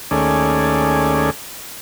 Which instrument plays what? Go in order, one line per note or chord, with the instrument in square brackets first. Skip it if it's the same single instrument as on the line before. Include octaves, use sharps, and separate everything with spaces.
[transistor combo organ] D#2 A3 C#4 G#4 D5